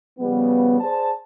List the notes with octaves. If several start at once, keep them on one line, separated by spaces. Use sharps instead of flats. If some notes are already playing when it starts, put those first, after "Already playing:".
C#3 F3 G3 B3
G#4 C5 D5 A5